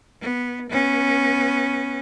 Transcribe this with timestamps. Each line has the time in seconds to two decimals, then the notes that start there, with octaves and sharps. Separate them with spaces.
0.21 B3
0.69 B3 C#4